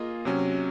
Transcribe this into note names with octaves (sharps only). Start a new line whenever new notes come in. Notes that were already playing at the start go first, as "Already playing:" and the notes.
Already playing: A#3 F4 G#4 D#5
C3 F#3 C#4